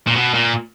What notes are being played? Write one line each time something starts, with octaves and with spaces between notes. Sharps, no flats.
A#2
B2
A#2